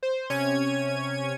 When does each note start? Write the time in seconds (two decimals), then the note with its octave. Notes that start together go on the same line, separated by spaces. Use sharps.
0.03 C5
0.30 C3 C#4 C#5 G#6 D#7